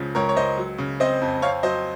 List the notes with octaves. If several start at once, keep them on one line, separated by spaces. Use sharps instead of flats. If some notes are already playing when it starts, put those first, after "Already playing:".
Already playing: C#2 C#3 F3
C#2 A#4 C#5
C#5
C#2 C5 D#5
F#3
C#3
C4 C5 D#5
F2
C4 C#5 F5
F#3 C5 D#5